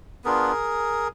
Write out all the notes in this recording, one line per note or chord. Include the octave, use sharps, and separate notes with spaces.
B3 D4 F4 G#4 A#4